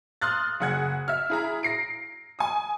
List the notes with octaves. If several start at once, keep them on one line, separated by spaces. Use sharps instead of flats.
C6 D#6 F6 F#6 A6
F#1 G#4 F#5 F#6 G#6
E5 F6
E4 G#4 A#5
A#6 C7 D7
G#5 D#6